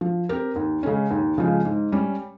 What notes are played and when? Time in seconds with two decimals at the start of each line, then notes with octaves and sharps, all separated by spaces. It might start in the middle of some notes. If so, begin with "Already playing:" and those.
0.01 F3
0.29 C4 G4 A#4
0.56 D#2
0.83 C#3 G#3 C#4
1.11 D#2
1.38 C#3 F3 G#3
1.65 G#2
1.92 G3 C#4